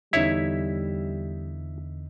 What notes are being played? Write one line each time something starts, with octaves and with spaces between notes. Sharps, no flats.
E2 D3 G3 D#4 E4 C#5 E5 B6